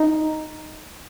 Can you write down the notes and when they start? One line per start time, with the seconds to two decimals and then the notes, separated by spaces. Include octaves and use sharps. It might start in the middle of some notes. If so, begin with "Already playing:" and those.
Already playing: D#4